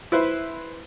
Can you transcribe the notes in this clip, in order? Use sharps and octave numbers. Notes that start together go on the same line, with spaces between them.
E4 B4 C5 E5